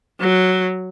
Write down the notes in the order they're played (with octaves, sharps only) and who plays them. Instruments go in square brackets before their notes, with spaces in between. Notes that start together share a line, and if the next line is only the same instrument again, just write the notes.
[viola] F#3